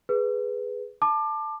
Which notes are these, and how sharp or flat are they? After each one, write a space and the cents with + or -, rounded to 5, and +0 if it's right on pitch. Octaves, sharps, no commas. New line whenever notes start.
G#4 +0 B4 +0
A5 +0 D6 +30